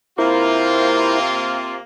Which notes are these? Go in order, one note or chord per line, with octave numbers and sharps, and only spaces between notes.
C3 A#3 E4 F4 A#4 C5